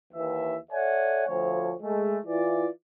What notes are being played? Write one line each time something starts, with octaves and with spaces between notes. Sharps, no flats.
D#2 E3 E5
A4 C#5 D5 E5 F#5 G#5
D2 F3 C#5
G#3 A3
E3 E4 F4 B4 D5